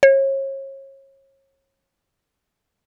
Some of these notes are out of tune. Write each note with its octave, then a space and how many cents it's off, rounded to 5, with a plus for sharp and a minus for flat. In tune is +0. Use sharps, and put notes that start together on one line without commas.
C#5 -35